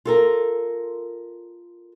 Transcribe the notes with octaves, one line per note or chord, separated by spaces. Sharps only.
F4 A4 A#4